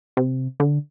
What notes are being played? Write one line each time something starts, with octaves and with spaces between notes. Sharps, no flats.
C3
D3